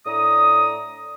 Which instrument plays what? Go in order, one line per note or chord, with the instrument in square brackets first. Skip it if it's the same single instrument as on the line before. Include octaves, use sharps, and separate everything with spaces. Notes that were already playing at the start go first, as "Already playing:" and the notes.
[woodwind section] A2 D4 A#5 D#6